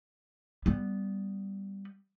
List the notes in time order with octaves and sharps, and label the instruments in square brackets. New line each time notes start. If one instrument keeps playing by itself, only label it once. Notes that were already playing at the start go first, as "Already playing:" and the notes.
[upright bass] G3 B3